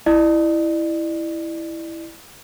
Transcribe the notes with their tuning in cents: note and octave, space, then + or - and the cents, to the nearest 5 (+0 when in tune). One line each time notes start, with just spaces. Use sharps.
E4 +0 D5 +40